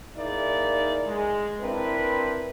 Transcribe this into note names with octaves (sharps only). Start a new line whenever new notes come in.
A#3 D#4 E4 G#4 D5
G#3
C4 D4 E4 A#4 B4